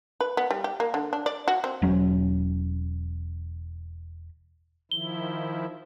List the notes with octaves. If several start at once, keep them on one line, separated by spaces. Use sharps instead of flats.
B4
B3
G3
G4
A#3
D3
D4
D5
F#4
C4
E1 F#3 C#4
D#3 F3 E4 G7